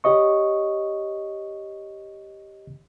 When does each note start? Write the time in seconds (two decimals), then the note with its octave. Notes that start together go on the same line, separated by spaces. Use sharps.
0.04 G4 C#5 D#5 C#6